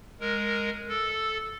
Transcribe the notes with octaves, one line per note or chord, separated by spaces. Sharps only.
G#3 A#4
A4